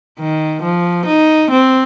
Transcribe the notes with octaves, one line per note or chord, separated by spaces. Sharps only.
D#3
F3
D#4
C4